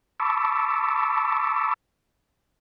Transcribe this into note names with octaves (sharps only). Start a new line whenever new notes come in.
A5 B5 C#6 D6 E6